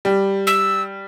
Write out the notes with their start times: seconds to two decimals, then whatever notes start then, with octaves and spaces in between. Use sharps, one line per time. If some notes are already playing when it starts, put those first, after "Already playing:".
0.05 G3
0.47 E6